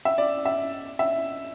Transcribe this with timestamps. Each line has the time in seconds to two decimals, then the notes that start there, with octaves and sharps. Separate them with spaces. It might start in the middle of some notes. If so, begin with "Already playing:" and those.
0.05 E5
0.18 D5
0.45 E5
0.99 E5